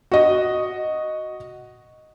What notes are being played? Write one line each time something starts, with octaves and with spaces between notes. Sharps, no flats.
F#4 D#5